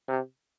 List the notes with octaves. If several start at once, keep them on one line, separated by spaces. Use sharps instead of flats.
C3